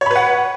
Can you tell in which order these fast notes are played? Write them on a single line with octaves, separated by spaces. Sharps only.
C#5 B5 B4 F#5